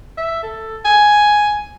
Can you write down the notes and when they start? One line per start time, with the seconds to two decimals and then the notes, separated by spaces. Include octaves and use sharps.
0.18 E5
0.43 A4
0.85 G#5